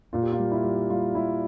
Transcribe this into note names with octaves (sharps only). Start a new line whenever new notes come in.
A#2 F4
G4
F4
G3
E4
G3
G3 F4
G3 E4